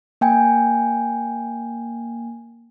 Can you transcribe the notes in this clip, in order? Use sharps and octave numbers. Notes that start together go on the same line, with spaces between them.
A#3 G5 G#5